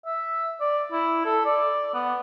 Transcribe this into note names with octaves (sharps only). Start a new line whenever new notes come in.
E5
D5
E4
A4
D5
B3